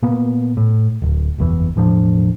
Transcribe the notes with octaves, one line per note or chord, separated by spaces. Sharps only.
A#2 A#3 B3
A2
D1
F#1 E2 E3
E1 A2 F3 D4